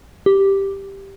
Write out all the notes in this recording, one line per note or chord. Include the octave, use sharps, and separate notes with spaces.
G4